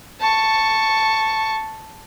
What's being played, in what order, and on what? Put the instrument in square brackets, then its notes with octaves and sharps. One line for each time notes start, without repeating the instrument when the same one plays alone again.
[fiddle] A5 C#6